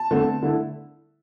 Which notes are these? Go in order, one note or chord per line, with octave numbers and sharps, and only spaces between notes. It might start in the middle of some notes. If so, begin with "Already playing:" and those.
Already playing: A5
E2 D3 A3 C4
D3 A3 E4